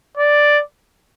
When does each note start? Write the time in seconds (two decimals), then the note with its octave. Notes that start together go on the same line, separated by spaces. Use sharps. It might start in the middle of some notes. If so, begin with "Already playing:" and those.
0.17 D5